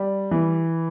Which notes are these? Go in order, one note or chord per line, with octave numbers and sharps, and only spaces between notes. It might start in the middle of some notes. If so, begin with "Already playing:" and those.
Already playing: G3
E3